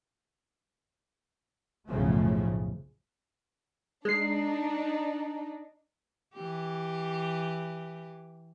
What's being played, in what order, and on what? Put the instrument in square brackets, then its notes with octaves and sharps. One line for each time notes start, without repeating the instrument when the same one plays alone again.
[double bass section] B1 F#2 A2 C#3 F3 A3
[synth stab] G#3 C7 [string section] D4 D#4
[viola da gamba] E3 G4